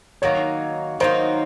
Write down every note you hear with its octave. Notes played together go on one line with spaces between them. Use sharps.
D#3 F#3 A#3 D#4 C#5
D#3 F#3 A#3 D#4 C5